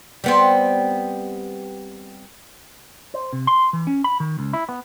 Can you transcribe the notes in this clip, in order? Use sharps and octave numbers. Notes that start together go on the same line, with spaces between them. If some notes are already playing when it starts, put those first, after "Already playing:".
G3 B3 C4
C5
C3
C6
E3
C#4
B5
D#3
C#2
E4
B3